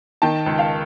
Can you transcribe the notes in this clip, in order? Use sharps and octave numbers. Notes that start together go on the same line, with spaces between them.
D#3 G5 A5
C#2
F5 G5